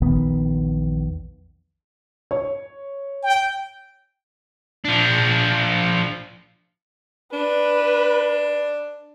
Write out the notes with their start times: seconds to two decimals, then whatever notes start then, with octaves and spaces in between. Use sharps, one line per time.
0.02 A#1 E2 D#3 B3
2.31 C#5
3.23 G5
4.85 F3 D4
7.33 D4 B4